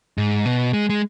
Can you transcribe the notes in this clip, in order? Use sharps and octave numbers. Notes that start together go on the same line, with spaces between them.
G#2
B2
G#3
G#3